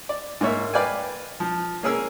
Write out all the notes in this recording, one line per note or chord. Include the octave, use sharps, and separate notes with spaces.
D5
G#2 A#3 C#5 E5
B4 D5 F5 G5 G#5
F3
A#3 C#4 G#4 A#4 E6